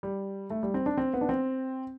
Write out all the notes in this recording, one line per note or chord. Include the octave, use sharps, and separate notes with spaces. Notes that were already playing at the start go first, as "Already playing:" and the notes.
G3
A3
G3
C4
D4
C4
B3
D4
C4